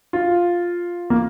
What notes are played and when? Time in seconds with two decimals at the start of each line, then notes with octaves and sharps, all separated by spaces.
0.13 F4
1.10 A#3